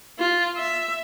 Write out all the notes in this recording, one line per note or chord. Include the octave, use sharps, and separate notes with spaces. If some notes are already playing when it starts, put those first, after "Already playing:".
F4
E5